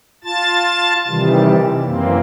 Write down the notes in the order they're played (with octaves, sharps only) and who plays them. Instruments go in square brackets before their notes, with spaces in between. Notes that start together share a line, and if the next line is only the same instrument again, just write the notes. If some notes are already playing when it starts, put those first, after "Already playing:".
[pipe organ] F4 A5 A6
C3 D#3 E3 G3
F#2 E3 A#3 C4